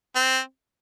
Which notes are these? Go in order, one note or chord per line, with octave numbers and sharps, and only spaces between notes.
C4